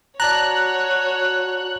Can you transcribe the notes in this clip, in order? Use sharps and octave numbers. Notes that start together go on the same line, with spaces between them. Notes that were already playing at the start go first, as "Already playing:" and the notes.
F#4 C#5 D5 A5 A#5 F#6